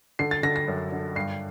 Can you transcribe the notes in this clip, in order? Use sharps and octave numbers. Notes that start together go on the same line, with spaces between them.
D3 C7
A6
D3 A#6
A#6
F#2
D3
G2 C7